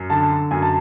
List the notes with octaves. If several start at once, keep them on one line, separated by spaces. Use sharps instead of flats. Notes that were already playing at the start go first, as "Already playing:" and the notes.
Already playing: F#2
D3 A5
F#2 G#5
A5